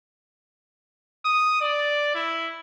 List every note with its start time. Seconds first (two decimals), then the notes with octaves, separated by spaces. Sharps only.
1.25 D#6
1.61 D5
2.15 E4